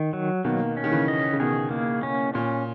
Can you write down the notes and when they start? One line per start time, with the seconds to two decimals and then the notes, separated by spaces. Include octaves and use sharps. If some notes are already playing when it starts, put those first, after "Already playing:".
Already playing: D#3
0.13 F#3
0.44 B2 D#3 A#3
0.77 C#4
0.84 D#3
0.92 C#3 E3
1.08 D#5
1.33 C#3
1.40 B2 D#3 G#4
1.71 A#3
2.03 C#4
2.34 A#2 C#4